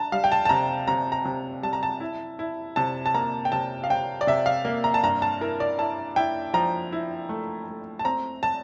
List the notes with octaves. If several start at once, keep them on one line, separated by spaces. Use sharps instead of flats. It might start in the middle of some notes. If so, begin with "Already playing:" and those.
Already playing: D4 A5 A#5
G3 F5
G5
A5
A5
C3 A#5
C3 A#5
A#5
C3
G3 A5
A#5
A5
E4
E4
C3 A5
A5
A#3 A#5
G5
C3 A5
F5
C3 G5
D5
C3 E5
F5
A#3
A#5
A5
G2 A#5
A5
E4 A#4
D5
E4 A5
E4 G5
F3 A#5
E4
A3
A3
A5
C4 A#5
A5